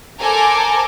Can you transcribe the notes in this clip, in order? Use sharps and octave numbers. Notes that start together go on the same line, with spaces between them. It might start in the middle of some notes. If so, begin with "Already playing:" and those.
A4 A#4 C5 G#5 A#5 D6